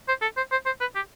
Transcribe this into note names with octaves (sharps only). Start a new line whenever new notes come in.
C5
A4
C5
C5
C5
B4
G4